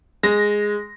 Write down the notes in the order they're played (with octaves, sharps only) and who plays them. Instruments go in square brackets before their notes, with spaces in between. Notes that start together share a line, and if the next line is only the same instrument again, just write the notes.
[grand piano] G#3 A#6